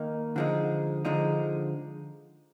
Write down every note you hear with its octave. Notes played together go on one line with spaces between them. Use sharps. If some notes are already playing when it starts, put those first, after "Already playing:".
Already playing: D#3 A#3 D#4
D3 F3 G#3 D#4
D3 F3 G#3 D#4